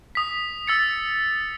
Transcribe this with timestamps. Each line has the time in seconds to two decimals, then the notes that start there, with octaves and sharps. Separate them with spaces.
0.15 D#6 B6
0.67 E6 A6 C#7